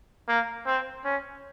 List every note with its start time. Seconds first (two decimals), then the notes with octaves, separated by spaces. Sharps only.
0.28 A#3
0.66 C4
1.05 C#4